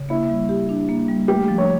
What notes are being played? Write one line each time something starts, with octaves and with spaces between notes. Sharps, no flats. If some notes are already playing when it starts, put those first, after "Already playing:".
Already playing: C#3
A#3 E4
G3
G4
D4
A#3
G3
A3 G4
F3
C#5